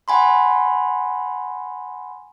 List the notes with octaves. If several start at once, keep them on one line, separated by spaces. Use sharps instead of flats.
F#5 G#5 B5 C6